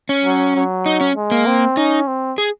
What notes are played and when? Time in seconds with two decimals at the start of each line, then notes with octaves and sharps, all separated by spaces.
0.09 C#4
0.24 F#3
0.56 F#3
0.86 D#4
1.01 C#4
1.16 G#3
1.31 A#3
1.46 C4
1.77 C#4 D#4
2.07 C4
2.38 G#4